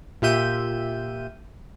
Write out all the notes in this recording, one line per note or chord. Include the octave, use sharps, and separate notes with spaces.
A#2 F4 G4 E5 G6 D#7